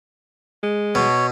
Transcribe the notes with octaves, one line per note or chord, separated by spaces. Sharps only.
G#3
B2 C#5